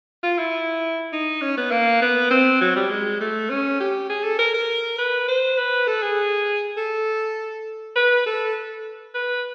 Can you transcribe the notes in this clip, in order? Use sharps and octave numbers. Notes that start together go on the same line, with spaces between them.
F4
E4
D#4
C#4
B3
A#3
B3
C4
F#3
G3
G#3
A3
C#4
G4
G#4
A4
A#4
A#4
B4
C5
B4
A4
G#4
A4
B4
A4
B4